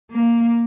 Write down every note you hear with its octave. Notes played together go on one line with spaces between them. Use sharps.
A#3